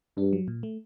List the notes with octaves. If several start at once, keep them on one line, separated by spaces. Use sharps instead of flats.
G2 D4
F#3
A#2
A3